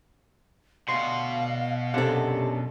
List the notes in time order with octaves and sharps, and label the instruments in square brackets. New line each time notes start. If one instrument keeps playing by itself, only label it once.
[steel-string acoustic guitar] D2 D4 [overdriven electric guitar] B2 F#4 [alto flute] F5 [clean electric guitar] C6
[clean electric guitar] F#2 D4 F#5 [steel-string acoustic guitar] C3 A4